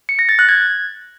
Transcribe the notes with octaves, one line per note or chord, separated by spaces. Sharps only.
C#7
A#6
A6
F#6
G#6